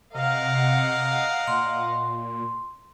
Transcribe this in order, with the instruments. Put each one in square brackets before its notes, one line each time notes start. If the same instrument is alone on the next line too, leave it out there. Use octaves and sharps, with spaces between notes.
[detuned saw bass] C3 [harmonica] A#4 [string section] D#5 F5 F#5
[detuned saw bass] A#2 [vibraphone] C6